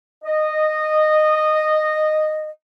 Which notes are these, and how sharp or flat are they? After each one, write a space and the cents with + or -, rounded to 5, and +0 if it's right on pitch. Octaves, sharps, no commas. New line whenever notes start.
D#5 -15